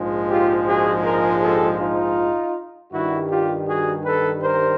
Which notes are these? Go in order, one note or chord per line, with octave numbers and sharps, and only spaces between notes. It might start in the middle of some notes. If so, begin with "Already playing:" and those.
Already playing: A#1 G#2 F3 G#3
F4 G4
F#4 G#4
G#4 A#4
G4 A4
D#4 F4
G2 D#3 G3 E4 F#4
F4 G4
F#4 G#4
A4 B4
A#4 C5